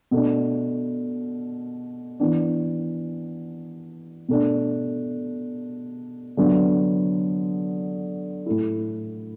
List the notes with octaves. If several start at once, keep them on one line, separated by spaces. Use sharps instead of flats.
B2 A3 D4
E3 B3 D4
B2 A3 D4
D3 F#3 B3 D4
A2 A3 E4